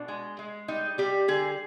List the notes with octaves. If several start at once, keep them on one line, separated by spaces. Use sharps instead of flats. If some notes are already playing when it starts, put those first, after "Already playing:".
Already playing: B2 D4
G#3
G#3
G3 D#4
G3 G4
D3 G#4